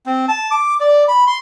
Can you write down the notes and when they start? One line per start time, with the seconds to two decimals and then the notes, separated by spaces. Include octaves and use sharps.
0.06 C4
0.28 A5
0.51 D6
0.80 D5
1.08 B5
1.27 C6